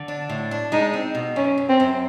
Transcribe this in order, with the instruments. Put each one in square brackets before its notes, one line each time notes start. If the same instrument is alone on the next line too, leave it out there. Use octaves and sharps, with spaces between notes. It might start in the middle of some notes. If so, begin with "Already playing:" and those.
Already playing: [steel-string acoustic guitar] D3
D4
A2
D4
[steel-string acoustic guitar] G#3 [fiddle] D#4
[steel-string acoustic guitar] C4
B2
[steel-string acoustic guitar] F#2 [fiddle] C#4
[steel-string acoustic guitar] F#2
[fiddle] C4
[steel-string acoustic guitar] F#2